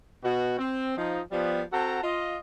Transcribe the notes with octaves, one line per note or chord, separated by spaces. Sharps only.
B2 F#4
C4
F3 D#4
F3 G3 B3
C4 F#4 A4 F#5 A5 A#5
F4 D#5